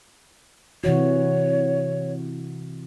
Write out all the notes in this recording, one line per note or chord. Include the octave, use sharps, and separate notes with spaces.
C3 E3 F#4 C#5